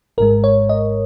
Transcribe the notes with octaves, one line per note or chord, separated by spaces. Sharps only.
G#1 G#2 G#3 A#4
C#5
D#5